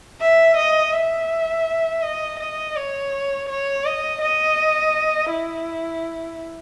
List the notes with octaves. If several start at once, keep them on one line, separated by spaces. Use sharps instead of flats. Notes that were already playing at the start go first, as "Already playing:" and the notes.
E5
D#5
E5
D#5
D#5
C#5
C#5
D#5
D#5
E4